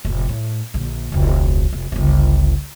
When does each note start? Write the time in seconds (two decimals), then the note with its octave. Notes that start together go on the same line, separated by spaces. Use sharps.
0.05 F1 A2
0.29 A2
0.74 A#1 D3
1.12 E1 C#2
1.73 F1
1.92 G1 C#2